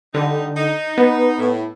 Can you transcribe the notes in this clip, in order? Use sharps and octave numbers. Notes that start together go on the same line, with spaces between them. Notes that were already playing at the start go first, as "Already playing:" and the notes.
D3 G3 D#4
D#4
B3
A2